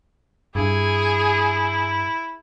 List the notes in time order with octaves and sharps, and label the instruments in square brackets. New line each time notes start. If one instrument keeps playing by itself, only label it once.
[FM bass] G2 [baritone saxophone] E4 [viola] G#4